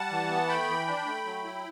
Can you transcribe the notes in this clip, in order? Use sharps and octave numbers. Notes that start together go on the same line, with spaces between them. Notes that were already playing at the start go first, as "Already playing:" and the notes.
Already playing: G3 F#5 A5
E3
B3
A3 G5 B5
E3
D4
A3
F#3
E4